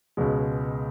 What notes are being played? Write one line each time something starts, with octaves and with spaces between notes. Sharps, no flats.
C#2 B2 G#3